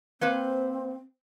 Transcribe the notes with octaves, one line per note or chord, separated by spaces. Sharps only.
A#3 C4 B4 C5